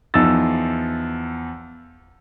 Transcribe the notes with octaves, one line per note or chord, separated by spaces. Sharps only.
E2 F3 D#4 E6 A6